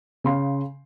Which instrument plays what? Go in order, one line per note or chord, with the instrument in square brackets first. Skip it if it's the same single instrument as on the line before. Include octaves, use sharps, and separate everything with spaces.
[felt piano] C#3 F5 C6